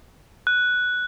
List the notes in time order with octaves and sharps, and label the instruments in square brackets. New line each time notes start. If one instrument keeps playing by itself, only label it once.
[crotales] F#6